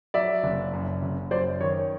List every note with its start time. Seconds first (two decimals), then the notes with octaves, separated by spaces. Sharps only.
0.14 F#3 D5 E5
0.43 F#1
0.73 F#2
1.02 F#1
1.31 F#2 C5 D5
1.60 D#3 C#5